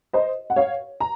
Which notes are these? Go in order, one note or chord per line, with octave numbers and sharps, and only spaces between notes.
C5 D#5
F#5
C#5 F5
A#5